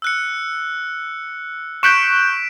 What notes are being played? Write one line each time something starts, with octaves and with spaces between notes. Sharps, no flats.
E6 F#6 C#7
C#6 F#6 G6 B6 D7 E7